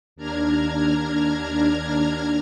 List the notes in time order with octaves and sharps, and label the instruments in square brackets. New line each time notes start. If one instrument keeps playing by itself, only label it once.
[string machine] D#2 D4 A#5 F6 G#6